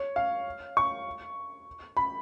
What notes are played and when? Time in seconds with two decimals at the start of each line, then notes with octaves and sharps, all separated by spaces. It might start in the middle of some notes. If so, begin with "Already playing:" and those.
Already playing: C#5
0.16 F5
0.77 C#6
1.97 B5